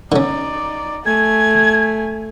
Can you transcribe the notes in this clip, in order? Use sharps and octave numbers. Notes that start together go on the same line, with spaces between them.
D3 C#4 D#4 D5
A3 G#5 G#6